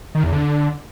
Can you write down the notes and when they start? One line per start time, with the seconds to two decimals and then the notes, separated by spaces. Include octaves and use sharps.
0.15 D#3
0.24 E2
0.33 D3